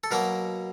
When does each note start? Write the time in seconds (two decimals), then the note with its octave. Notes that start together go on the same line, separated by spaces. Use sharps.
0.04 A4
0.11 B2 F#3 A#3 A#4